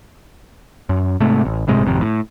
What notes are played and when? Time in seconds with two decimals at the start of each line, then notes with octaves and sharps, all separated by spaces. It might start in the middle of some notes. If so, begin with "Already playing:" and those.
0.89 F#2
1.20 G#2 C3 A3
1.45 A1
1.67 G1 A2 C3 G#3
1.86 G#1 F2 C3
2.01 A2